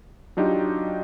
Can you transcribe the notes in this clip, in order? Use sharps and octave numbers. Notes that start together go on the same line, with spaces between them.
F#3 D4 D#4 F4 G4